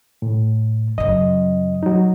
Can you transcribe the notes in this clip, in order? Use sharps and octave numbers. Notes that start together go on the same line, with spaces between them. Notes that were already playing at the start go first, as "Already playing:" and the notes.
A2
F#2 C#3 D#5
F#3 D#4